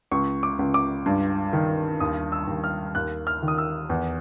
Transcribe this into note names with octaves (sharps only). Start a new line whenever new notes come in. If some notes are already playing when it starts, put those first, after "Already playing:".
C#2 C#6
D6
C#2
D6
G2
D#3
D#2 D#6
E6
D#2
F6
D#2 F#6
F6
D#3
D#6
E6
E2